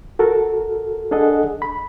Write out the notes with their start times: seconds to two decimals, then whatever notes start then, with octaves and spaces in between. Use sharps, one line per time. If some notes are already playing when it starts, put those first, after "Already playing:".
0.19 F#4 A4 A#4
1.11 D4 G#4 A4 D#5 F#5
1.62 B5